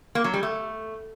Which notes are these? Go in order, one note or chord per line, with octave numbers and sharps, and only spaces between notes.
A#3
F#3
G3
A3